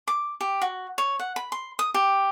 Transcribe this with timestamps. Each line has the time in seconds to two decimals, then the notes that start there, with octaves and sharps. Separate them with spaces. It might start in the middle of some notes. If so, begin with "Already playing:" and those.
0.08 D6
0.41 G4
0.62 F#4
0.98 C#5
1.19 F#5
1.36 B5
1.52 C6
1.79 D#6
1.94 G4